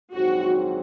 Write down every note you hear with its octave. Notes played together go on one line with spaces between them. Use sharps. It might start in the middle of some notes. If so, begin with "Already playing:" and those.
A#1 G#2 D#3 F#3 C4 F#4